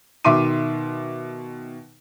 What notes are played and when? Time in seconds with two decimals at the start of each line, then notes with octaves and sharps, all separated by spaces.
0.24 B2 D#3 E5 C6 D6 D#7